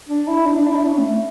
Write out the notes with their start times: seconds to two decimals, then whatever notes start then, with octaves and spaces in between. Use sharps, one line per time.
0.09 D4
0.28 E4
0.46 D4
0.57 D4
0.67 E4
0.76 D4
0.85 C#4
0.98 A3